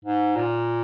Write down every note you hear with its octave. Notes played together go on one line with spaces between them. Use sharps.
G#2
A#2